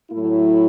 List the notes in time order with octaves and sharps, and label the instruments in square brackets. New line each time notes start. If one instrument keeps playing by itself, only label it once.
[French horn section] A2 F#3 A3 E4